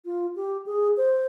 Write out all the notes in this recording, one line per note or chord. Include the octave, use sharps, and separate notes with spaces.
F4
G4
G#4
C5